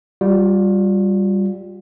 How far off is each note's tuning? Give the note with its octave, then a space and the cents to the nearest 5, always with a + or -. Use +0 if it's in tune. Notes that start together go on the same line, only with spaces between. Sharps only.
G3 +0 F4 +30